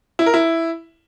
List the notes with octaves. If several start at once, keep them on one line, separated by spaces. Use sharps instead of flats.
E4
A#4
E4